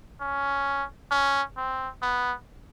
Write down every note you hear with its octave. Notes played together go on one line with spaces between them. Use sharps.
C#4
C#4
C4
B3